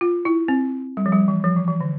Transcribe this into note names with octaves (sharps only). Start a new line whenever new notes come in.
F4
E4
C4
G3
F3
G3
E3
F3
E3
E3
D3